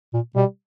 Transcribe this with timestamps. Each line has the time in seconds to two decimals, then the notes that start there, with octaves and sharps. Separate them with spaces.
0.14 A#2
0.35 B2 G3